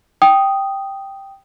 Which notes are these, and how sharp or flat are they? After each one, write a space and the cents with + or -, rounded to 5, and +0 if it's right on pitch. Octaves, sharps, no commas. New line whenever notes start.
G5 +0 D#6 +0